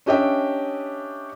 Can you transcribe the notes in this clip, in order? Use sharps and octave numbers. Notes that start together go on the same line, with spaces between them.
C#4 D4 G4 D#5 E5 G5